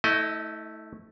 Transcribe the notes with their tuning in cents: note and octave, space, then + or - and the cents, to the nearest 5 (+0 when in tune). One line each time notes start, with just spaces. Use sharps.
A3 +0 E4 -35 D#5 +0